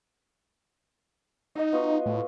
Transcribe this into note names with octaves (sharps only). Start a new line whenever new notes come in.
D#4 D#5 F#5 E6
B3 F4 F#4
A2